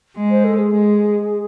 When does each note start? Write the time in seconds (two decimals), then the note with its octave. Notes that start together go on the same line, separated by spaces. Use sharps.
0.17 G#3
0.30 C5
0.44 A4
0.58 G#4
0.72 G#3